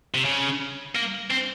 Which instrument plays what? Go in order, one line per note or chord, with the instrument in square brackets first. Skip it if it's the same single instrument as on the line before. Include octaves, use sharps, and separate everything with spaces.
[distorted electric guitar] C3
C#3
A#3
C4